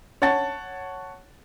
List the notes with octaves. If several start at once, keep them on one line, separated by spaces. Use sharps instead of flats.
C#5 F#5 A5 A6